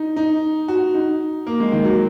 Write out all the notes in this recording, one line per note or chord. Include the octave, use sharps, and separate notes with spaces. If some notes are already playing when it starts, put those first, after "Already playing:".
Already playing: D#4
D#4
F#4
D#4
A#3
G#3
D#3
F#3